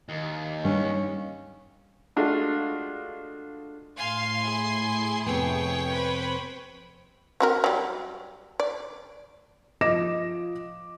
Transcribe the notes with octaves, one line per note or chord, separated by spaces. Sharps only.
D#2
G2 G3 C#4
G#3 A3 D4 F4 F#4
A2 F5 G#5 C6
E4 G#4
F2 C3 B3 C#5 G5
B4 C5 B5
C4 F#4 A#4
F#3 G3
D5
F3 D#5 D6 A#6 E7